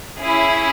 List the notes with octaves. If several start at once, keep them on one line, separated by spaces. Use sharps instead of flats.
C#4 E4 G#4